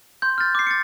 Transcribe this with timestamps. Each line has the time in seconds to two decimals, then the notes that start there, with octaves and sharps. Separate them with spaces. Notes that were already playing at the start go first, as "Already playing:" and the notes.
0.22 C6 G6
0.38 F6 A6
0.55 D6 C7
0.67 A6 C#7